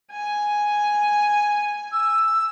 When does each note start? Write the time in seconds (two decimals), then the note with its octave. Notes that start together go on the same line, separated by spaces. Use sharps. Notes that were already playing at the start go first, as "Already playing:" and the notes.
0.12 G#5
1.92 E6